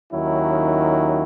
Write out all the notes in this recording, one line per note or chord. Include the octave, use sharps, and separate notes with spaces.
D#2 D#3 F#3 C#4 E4